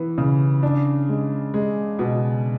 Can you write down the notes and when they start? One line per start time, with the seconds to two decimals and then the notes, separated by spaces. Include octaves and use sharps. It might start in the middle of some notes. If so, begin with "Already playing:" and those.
Already playing: E3 B3
0.18 C#3
0.63 D4
1.09 G#3
1.54 G#3
1.99 B2